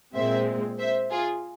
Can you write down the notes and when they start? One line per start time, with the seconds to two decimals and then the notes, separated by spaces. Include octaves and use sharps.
0.15 A#2 G#3 C4 C5 E5
0.79 C5 E5
1.11 F4 G#4